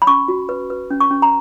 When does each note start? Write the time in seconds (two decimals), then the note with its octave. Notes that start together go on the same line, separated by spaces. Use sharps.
0.02 B5
0.07 C#4 C#6
0.28 F#4
0.49 B4
0.70 B4
0.91 C#4
1.00 C#6
1.11 C#4
1.22 A#5